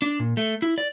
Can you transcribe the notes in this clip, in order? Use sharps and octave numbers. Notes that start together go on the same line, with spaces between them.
D4
A#2
A3
E4
D5